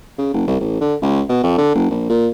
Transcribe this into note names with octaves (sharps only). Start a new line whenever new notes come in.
C#3
F#1
C2
A1
D3
C#2
B2
F2
D3
F#1
A#1
A#2